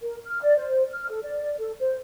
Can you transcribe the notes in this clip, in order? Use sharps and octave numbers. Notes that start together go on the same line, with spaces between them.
A#4
F6
D5
C5
F6
A4
D5
A4
C5